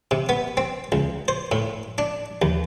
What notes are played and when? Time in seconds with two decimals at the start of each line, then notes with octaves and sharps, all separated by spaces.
0.11 C3
0.29 B3
0.57 C4
0.92 C#2
1.28 C5
1.52 A2
1.98 D4
2.42 D#2